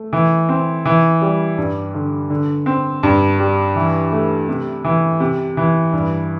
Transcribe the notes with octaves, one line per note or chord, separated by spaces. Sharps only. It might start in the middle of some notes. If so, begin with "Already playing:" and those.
Already playing: A3
E3
C4
E3
G3
G2
D3
D3
C4
G2
G3
E3
A3
C3
E3
C3
E3
G2